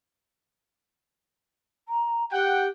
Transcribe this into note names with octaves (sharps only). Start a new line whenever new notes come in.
A#5
G4 F#5 G5